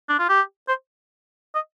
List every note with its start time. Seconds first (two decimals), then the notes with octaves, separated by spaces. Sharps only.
0.09 D4
0.19 F4
0.29 G4
0.68 C5
1.55 D#5